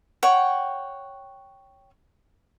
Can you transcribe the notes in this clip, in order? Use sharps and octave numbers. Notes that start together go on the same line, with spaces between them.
C#5 F#5 G5